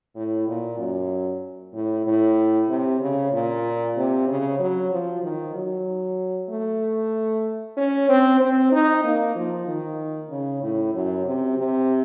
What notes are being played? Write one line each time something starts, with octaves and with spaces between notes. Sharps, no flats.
A2
A#2
F#2
A2
A2
C3
C#3
A#2
C3
C#3
F#3
F3
D#3
F#3
A3
C#4
C4
C4
D#4
A#3
F3
D#3
C#3
A2
F#2
C3
C3